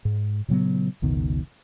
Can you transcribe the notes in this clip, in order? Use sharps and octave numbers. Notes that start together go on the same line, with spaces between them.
G#2
A#2 C#3 F#3 B3
F#1 C#2 B2 D#3